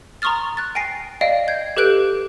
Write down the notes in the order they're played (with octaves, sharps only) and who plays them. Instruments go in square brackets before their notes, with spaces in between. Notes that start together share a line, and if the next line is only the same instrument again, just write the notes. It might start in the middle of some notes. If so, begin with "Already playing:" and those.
[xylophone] A#5 C6 C#6 D#6 F6 A6
F#6 A6
G5 G#5 A#6 C7
D5 D#5 F5 G5
G6 G#6 C7
G4 A4 B4 F#6 G6 D7